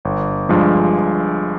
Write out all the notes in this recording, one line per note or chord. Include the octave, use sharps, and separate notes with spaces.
G1
G2 F3 G#3